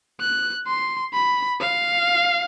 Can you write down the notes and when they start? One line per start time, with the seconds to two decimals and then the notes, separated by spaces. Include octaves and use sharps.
0.20 F#6
0.67 C6
1.13 B5
1.60 F5